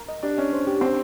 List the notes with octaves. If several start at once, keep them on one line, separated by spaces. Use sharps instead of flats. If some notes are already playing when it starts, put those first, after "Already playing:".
Already playing: A#4
D#5
D4 G4
C#4 D#5
C5
G4
C4 D4